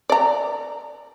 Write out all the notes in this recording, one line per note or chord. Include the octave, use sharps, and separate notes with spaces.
D5 A#5